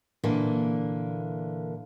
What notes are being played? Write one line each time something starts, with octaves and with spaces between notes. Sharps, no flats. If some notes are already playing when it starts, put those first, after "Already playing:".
A#2 D3 E3 A#3